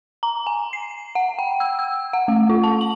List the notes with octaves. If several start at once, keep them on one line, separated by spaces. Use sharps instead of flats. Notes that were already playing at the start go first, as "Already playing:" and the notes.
A#5
G#5
C7
F#5
G5
E6
E6
F#5
A3
F4
A5
F#7